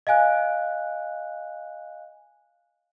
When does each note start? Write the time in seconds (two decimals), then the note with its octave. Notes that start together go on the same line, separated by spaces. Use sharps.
0.07 D#5 F5 G#5 F#6